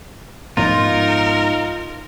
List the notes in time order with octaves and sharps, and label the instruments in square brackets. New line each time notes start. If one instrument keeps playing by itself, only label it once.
[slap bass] G#2 F3 B3 [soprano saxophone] D#4 [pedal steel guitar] F4 [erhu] A#4